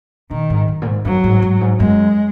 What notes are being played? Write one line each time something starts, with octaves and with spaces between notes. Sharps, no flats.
A#2 D#3
G#2
F#2
A#2
G#2
F#2 F#3
G#2
G#2
F#2
G#2
F#2 G#3